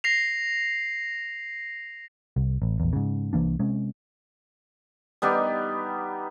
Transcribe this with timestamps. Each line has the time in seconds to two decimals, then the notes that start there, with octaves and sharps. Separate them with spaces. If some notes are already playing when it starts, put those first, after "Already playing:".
0.04 A#6 C7 F7
2.36 C2
2.62 A1
2.80 A#1 E2
2.93 G#2 C#3
3.33 C2 E3 A#3 D4
3.60 C3 G#3 C#4
5.22 G3 B3 D#4 G4